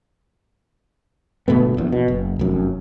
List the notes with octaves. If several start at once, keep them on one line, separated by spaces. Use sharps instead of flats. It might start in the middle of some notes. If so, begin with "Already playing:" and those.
G1 B2 A3 B3
A#1 E2
B2
F#1
F1 F#2